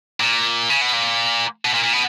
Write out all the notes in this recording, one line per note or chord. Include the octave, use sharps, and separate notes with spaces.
A#2
C#3
B2
A#2
B2
A#2
A#2
B2